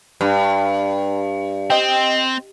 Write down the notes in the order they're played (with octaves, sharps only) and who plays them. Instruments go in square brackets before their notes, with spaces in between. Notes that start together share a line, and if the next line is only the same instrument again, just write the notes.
[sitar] G2
[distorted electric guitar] C4 [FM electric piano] D#5 G5